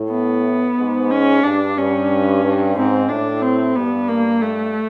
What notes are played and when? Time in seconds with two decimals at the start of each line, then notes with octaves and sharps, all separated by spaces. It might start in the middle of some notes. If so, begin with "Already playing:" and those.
Already playing: A2
0.10 B3
0.77 G#2
1.11 C#4
1.43 G2 D4
1.77 G2 C#4
2.43 G2
2.76 G#2 C4
3.09 A2 D4
3.42 C4
3.75 G2 B3
4.08 A#3
4.41 A3